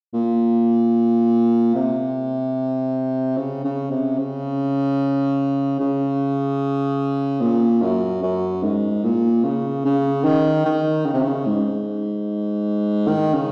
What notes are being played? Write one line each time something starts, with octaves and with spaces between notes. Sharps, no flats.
A#2
C3
C#3
C#3
C3
C#3
C#3
A#2
F#2
F#2
G#2
A#2
C#3
C#3
D#3
D#3
C#3
C3
C#3
G#2
D#3
C#3